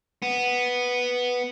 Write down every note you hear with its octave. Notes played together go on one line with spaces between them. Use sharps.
B3